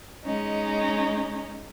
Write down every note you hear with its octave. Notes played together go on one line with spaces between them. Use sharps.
G#3 C#4 D#4